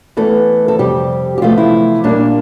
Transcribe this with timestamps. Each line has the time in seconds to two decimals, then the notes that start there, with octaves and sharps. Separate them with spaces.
0.17 E2 E3 A3 A4
0.68 A4
0.79 F2 C3 G3 G4
1.38 G4
1.42 E2 C3 F3 A3 F4
1.58 E4
2.04 A#2 G3 A#3 D4